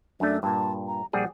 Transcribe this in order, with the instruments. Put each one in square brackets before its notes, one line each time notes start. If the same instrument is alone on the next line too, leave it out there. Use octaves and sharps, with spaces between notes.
[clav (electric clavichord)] F#2 A3 [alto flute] D4
[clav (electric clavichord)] G2 A#2 [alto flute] A5
[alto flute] A#5
[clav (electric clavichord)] A#1 G3 G#4 [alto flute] F#5